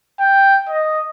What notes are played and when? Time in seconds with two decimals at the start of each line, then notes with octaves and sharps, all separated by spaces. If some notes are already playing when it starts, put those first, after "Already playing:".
0.20 G5
0.69 D#5